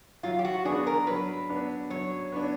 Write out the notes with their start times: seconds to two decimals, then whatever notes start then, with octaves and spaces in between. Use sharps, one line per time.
0.23 F#3 F4
0.39 G4
0.45 F#4
0.65 B3 D4 G#4
0.87 A#4
1.07 F#3 B4
1.49 B3 D4
1.90 F#3 C#5
2.32 B3 D4